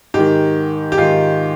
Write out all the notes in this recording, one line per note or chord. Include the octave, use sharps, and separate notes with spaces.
G#2 D#3 G4
G4
G#2 D#3 F4